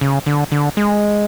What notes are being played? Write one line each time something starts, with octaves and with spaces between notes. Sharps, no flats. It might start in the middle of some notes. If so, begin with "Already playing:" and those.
C#3
D3
D3
G#3